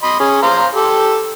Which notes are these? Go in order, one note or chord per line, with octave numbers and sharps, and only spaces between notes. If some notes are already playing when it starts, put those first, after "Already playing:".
D#5 B5 C6
C#4 G#4
C5 F5 A#5
G4 A4